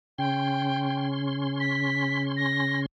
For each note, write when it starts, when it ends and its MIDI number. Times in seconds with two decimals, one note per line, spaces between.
0.18 2.86 49
0.18 2.86 61
0.18 1.06 79
0.18 2.86 84
1.60 2.23 95
2.37 2.81 94